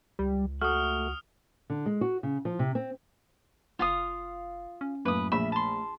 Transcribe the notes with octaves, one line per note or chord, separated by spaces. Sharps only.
C#2 G3
A3 F#4 D#6 F6
D3
G#3
F#4
C#3
F3
C3
C4
F#1 F4 F5 D#6
C#4
F#2 A2 A#3 B4 D#6
A#1 A#2 A3 E5 B5
A5 C6